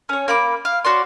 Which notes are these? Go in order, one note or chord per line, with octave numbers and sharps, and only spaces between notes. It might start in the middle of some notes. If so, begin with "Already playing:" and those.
C#4 C#5
A#3 B5 D6
F5
F#4 C#5 D5 C6